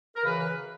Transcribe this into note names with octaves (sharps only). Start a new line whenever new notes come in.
A#4
F#2 C#3 E3 B4
B4